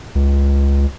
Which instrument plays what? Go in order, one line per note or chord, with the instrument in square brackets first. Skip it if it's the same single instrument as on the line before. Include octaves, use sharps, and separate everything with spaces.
[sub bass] C#2